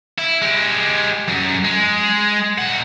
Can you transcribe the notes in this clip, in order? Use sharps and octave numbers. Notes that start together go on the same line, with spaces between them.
E4
G#3 G4
F#2
G#3
A#2 F#5